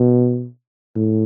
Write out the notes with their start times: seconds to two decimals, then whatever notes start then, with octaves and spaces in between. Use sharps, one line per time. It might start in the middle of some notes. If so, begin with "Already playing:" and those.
Already playing: B2
0.96 A2